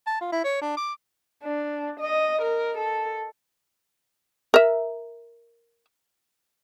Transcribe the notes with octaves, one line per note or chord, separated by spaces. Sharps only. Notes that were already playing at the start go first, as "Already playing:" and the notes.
A5
F4
E4
C#5
D4
D6
D4
D#5
A#4
A4
A#4 E5